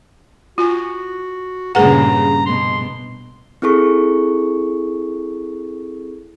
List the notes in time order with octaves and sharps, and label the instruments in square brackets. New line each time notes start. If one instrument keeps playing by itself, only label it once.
[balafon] F4 G#5 [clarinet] F#4
[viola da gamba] G2 A#2 C#3 [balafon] G#4 B4 F#5 [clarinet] A#5
[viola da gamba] B2 [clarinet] C6
[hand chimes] C4 E4 G#4 A4 C#6